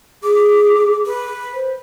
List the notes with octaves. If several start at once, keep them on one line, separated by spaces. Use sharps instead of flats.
G#4 D6
B4
C5